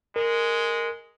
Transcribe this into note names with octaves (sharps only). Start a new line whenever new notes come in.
G#3 A#4